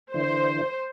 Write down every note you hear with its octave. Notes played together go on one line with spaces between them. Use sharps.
D3 E3 C5